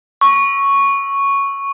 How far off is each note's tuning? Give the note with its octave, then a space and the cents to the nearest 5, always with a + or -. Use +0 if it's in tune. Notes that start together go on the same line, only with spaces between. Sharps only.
C#6 +0 E6 +0